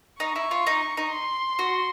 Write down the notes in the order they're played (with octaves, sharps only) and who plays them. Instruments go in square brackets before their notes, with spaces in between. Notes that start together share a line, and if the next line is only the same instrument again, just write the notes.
[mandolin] D#4 [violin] C#6
[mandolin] E4
F4
D#4
D#4
[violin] C6
[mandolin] F#4